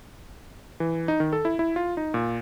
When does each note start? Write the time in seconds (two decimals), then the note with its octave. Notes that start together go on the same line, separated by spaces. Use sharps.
0.80 E3
1.08 D#4
1.20 D#3
1.33 A4
1.45 E4
1.59 E4
1.76 F4
1.97 D#4
2.14 A#2